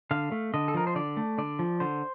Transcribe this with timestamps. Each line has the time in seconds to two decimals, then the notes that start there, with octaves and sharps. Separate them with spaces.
0.11 D3 F5
0.32 A3
0.54 D3 D#5
0.68 A4
0.74 F3 A#4
0.87 C5
0.95 D3 D5
1.17 A3
1.38 D3 D5
1.59 F3
1.80 D3 C5